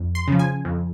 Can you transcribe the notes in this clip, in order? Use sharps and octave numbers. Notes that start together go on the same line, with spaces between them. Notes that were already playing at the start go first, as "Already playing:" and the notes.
Already playing: F2
C6
C#3 F3
G#5
F2